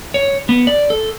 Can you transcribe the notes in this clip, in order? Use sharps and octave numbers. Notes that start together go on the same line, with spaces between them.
C#5
B3
D5
A4